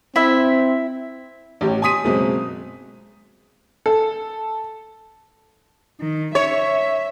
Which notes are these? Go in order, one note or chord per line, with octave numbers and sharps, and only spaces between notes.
C4 E4 E5
A1 G4 C#5
G#5 C6 D#6 B6 D#7
F#1 B2 G#3 C4
A4
D#3
C#5 E5